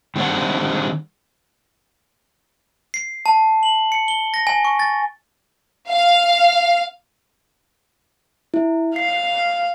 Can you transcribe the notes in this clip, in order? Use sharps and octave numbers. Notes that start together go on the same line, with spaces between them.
D#3 G3 C4 D4 F#5
C7
A5
F#7
C#7
G7
A#6
G#5
C#6
A6
F5
E4
F5 C7